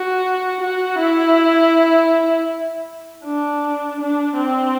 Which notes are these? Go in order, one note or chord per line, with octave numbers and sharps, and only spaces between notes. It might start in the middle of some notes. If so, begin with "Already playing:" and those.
Already playing: F#4
F#4
E4
D4
D4
C4